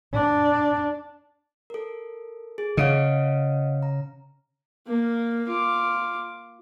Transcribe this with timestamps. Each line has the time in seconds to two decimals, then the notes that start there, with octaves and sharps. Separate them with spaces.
0.13 D4
1.70 A4 A#4
2.58 G#4
2.77 C#3 D#5 F5 F#5
3.83 A#5
4.87 A#3
5.48 F4 D6